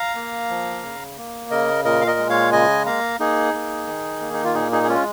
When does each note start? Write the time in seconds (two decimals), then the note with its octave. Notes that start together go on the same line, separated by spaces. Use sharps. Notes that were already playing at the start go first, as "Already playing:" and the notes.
Already playing: F5 A#5
0.15 A#3
0.50 F3
0.83 C#3
1.17 A#3
1.51 C#3 A#4 D#5
1.85 A#2 A#4 D#5
2.01 F5
2.07 A#4 D#5
2.19 G#3
2.30 C#5 F5
2.52 C#3 D#5 G#5
2.86 A#3 F5 A#5
3.20 A#3 D#4 G#4
3.54 A#3
3.87 D#3
4.21 A#3
4.33 D#4
4.44 F4
4.55 A#2 D#4 G#4
4.72 D#4 G#4
4.83 G#4
4.88 G#3 C#4 F4